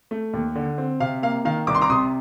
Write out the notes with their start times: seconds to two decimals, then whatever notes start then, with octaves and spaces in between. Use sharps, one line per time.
0.11 A3
0.33 D#2
0.55 D3
0.78 C4
1.00 C3 F5
1.22 A#3 F5
1.45 D#3 F5
1.67 C2 D6
1.75 C6
1.82 A#5 D6
1.90 C3 C6 D#6